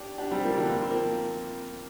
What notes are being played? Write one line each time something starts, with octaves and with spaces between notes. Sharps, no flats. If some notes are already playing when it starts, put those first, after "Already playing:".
Already playing: D4 G4
D4 G4
G3 C4
F3 A#3
D3 G3
A#3
C4
F3 A#3